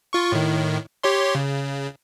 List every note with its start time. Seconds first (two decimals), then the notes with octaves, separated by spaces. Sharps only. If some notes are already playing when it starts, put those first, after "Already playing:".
0.13 F4 C#6
0.32 A2 D#3
1.03 G4 C#5 C6
1.35 C#3